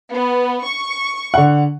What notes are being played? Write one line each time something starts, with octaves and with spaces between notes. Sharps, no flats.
B3
C#6
D3 F#5